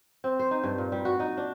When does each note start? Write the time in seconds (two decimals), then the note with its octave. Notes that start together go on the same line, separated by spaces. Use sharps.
0.24 C4
0.39 C5
0.51 D#4
0.64 G2
0.78 A#2
0.92 G3
1.05 F#4
1.20 D#4
1.37 D4